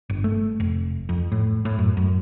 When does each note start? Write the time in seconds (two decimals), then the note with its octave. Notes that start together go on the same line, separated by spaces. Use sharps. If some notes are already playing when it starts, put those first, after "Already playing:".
0.10 G1
0.24 A3
0.60 F1
1.09 F2
1.32 A2
1.65 A2
1.78 F#2
1.97 F#2